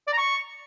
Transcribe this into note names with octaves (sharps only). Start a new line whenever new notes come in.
D5
A#5
C#6